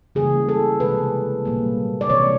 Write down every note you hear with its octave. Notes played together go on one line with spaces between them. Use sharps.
C#3 E3 G3 A#3 G#4
A4
C3 E3 G#3 B4
A#2 G3 A#3
D5
C3 E3 G3 C#5